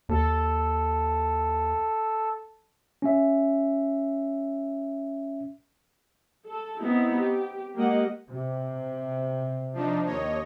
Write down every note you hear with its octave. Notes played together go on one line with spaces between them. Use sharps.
D#2 A4
C#4 E5
A4
B3 C4 D#4 E4
G4
G#3 A#3 G4 D#5 F#5
C3
F3 D4 D#4
D#2 C#5 D#5